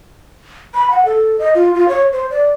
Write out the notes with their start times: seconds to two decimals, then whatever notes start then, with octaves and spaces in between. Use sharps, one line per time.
0.74 B5
0.91 F#5
1.05 A4
1.39 D#5
1.55 F4
1.74 F4
1.89 C#5
2.12 C5
2.31 D5